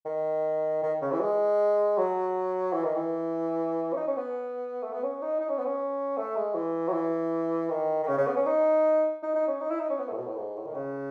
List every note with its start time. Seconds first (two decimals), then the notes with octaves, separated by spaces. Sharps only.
0.06 D#3
0.83 D#3
1.02 C#3
1.12 E3
1.21 G#3
1.98 F#3
2.73 E3
2.84 D#3
2.95 E3
3.93 C#4
3.97 D#4
4.07 C#4
4.17 B3
4.83 A3
4.93 B3
5.03 C#4
5.22 D#4
5.40 D#4
5.49 C#4
5.58 B3
5.65 C#4
6.18 A3
6.36 G#3
6.55 E3
6.88 F#3
6.93 E3
7.70 D#3
8.03 D#3
8.07 C#3
8.18 C#3
8.27 B3
8.36 C#4
8.46 D#4
9.23 D#4
9.35 D#4
9.47 C#4
9.61 D#4
9.71 E4
9.80 D#4
9.90 C#4
9.99 B3
10.08 A3
10.13 A2
10.18 B2
10.27 A2
10.37 G#2
10.56 A2
10.66 D#3
10.74 C#3